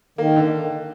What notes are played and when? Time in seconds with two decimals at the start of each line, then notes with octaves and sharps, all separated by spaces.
0.18 D#3 A#3
0.36 D3